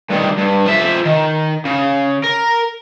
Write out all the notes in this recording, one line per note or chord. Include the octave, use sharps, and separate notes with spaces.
G2 D#3
G2
F3 E5
D#3
C#3
A#4